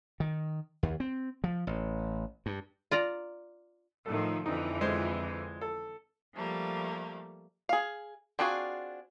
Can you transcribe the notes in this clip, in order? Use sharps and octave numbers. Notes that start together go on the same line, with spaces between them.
D#3
D#2
C4
F3
A1
G2
F4 D5 A#5
A2 D#3 F3 A4
F2 D3 E3 D#4
G#3 C5
A4
F3 G3 A3 A#3
G#4 F5
C4 D4 F4 F#4 G#4